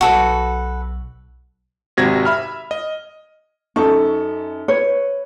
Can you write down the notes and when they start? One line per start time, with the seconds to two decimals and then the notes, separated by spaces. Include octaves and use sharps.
0.01 B1 F#4 A4 B4
1.97 G#1 C3 F#4 G#6 A#6
2.25 E5 B5 F6
2.71 D#5
3.76 F#2 D#4 A4 C#6
4.68 B4 C#5